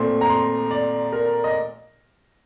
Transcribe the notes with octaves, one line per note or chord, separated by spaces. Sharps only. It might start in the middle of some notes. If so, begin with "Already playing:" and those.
Already playing: A#2 A3 C4 C6
A#5
C6
D5
A#4
D#5